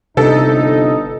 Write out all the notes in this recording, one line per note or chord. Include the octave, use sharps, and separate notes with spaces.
G1 C3 D#4 A4